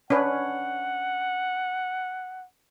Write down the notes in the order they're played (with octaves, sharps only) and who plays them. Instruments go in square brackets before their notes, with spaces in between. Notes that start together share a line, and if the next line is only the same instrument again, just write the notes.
[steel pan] C#4 D4 B4 [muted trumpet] F#5